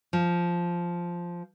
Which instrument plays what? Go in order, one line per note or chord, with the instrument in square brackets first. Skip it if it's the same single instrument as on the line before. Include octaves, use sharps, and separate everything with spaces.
[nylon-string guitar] F3